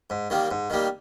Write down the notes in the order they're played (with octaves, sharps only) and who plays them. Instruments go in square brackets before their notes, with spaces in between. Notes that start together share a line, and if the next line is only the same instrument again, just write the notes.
[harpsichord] G#2
D#3 G3 A#3
G#2
D#3 G3 A#3